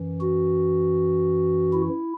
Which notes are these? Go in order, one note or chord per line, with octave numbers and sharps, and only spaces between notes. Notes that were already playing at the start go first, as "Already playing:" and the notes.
Already playing: F#2 E3
F#4
E4